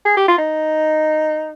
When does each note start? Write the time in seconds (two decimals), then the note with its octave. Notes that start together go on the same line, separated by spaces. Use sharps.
0.05 G#4
0.17 G4
0.28 F4
0.38 D#4